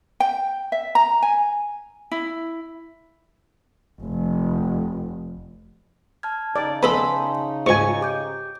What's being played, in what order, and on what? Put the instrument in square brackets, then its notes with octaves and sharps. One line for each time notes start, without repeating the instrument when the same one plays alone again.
[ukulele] G5
E5
A#5
G#5
E4
[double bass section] F1
[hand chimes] A5 F6 G#6
[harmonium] C#3 D#4 [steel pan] D5
[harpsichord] B3 A4 D#5 [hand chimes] G#5 A5 C6 [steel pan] B5
[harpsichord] C#2 G#2 [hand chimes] D#5 [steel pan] G#5 C#6
[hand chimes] G4 D6 G6